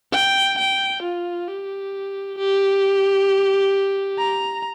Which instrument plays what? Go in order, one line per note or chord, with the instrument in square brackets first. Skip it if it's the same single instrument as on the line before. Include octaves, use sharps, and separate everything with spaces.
[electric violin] G5
G5
F4
G4
G4
A#5